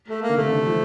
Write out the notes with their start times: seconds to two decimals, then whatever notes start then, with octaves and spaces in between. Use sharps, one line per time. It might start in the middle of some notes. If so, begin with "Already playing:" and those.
0.09 A3
0.22 A#3
0.29 D3
0.37 C3 A3
0.47 C3
0.52 D3
0.66 F3